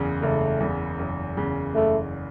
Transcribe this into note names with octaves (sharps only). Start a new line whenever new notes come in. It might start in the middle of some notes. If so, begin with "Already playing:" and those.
Already playing: F#1 E2 C#3
F#1 A3
E2 C#3
F#1
E2 C#3
F#1 A3